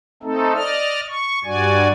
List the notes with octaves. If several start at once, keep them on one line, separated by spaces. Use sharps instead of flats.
A3 C4 D#4 A4
D5 D#5 F6
C#6
G2 G3 F#4 D5 G#5